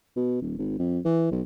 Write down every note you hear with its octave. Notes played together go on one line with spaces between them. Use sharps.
B2
D#1
G#1
F2
E3
B1